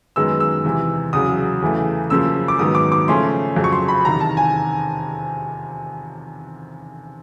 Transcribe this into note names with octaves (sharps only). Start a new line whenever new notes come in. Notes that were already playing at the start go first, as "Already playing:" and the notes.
F#2 D#3 G#3 B3 E6
E6
E2 C3 E3
E2 C#3 F#3 D#6
E2 C#3 E3 A3
F#2 C#3 F3 A#3 E6
D6
G#2 D#3 F#3 B3 D#6
D6
D6
C#3 F3 A3 C#4 C6
F2 C#3 F#3
C#6
C6
B5
E2 C3 D#3 A#5
A5
G#5